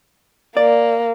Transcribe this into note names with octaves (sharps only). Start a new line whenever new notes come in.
A#3 D5